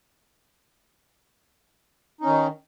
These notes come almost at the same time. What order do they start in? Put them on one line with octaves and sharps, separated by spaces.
D#4 C#4 D#3